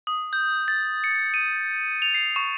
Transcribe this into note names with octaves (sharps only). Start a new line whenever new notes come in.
D#6
G6
A6
C#7
D#7
F7
C7
C#6